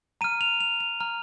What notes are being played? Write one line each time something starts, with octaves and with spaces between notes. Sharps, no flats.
A#5 F6 D#7
F7
F7
F7
A#5 F6